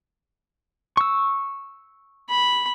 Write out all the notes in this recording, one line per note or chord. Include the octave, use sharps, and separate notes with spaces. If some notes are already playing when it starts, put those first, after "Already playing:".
C#6 E6
B5